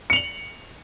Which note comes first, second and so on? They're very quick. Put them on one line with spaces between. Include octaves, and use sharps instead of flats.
C#7 F7 F#7